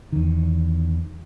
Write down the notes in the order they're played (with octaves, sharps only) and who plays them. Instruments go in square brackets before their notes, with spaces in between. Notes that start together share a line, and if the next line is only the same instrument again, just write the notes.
[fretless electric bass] E2 D#3